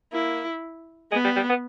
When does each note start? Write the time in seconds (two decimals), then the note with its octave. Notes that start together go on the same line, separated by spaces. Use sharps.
0.12 A#3 E4
1.12 G#3 B3
1.24 G3
1.36 G3
1.49 B3